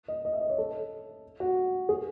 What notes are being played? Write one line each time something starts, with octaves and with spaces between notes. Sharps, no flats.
D#5
D#5
E5
D#5
C#5
A4
F#4
G#4